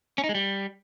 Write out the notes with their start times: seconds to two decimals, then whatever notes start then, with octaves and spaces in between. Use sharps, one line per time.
0.18 C#4
0.24 D#4
0.29 G#3
0.35 G3